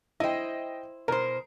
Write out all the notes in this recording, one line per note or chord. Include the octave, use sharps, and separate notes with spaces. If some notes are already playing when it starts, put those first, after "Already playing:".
E4 C5 D#5 G5
B2 A#4 C5